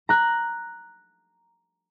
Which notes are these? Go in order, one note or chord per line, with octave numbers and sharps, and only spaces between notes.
A#5 F#6